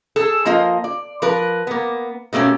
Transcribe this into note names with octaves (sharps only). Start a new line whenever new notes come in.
G#4 A4
F3 A#3 F4 D#5
D5
F3 A#4 B4
A#3 B3
B2 A3 A#3 C#4 G4